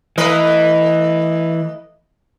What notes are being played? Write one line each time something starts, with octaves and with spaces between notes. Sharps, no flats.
E3 A3 B4 D#5